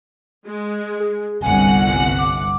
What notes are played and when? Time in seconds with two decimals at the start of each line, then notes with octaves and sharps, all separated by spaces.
0.45 G#3
1.00 G#4
1.42 G1 C2 F#5 G#5
2.18 D6